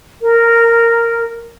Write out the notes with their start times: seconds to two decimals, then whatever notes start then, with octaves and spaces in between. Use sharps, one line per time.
0.22 A#4